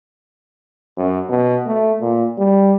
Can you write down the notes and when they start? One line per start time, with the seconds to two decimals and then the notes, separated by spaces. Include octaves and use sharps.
0.97 F#2
1.29 B2
1.67 A3
2.01 A#2
2.38 G3